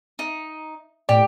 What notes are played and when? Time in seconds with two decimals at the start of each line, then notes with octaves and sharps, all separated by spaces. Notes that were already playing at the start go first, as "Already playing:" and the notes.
0.19 D#4
1.09 A2 G4 D5